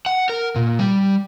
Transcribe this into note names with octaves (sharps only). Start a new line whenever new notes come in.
F#5
A#4
A#2
G3